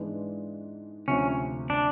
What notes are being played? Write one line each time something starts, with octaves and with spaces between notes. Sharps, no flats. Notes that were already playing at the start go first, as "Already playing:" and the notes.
Already playing: G#2 E3 G#3 B3 D4
D2 C3 F3 A3 C4 C#4
D4